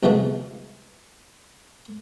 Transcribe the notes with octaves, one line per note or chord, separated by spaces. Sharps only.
C2 B2 F3 G#3 A3